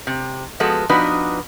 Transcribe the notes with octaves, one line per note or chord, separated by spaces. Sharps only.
C3
F3 G#3 B3 F#4 A4
F3 B3 D4 D#4 F#4 B4